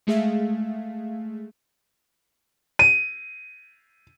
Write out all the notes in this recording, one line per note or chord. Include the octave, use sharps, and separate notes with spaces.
G#3 A3 G#4 E5 F5
D#7